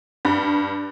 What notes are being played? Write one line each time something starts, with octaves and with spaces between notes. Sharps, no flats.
G2